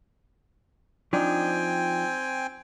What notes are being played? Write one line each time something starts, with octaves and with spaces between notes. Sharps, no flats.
F3 C4 D4 D#4 G5 G#5